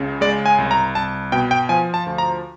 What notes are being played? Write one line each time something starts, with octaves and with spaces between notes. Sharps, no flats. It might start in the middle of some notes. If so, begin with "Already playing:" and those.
Already playing: C#2 C#3
G#3 D5
G#5
C2
A#5
C2 A5
B2 G5
G5
F3 G#5
A5
D2
A#5